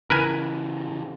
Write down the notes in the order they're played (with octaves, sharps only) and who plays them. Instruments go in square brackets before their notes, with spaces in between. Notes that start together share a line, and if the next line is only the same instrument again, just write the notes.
[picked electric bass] C#3 E3 [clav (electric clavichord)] A#4 B4 G#5